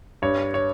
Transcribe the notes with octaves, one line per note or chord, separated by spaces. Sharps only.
G2 C#5
C#5